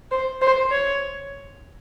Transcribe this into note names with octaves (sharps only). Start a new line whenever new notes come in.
C5
C5
C#5